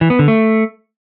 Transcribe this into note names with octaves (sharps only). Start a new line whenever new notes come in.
E3
B3
D3
A3